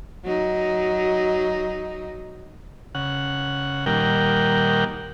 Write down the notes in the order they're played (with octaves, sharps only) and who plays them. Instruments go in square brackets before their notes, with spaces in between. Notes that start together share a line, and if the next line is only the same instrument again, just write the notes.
[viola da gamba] F#3 D#4
[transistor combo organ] C#3 F#5
A#2 D#3 G3 A#4 F#5 G5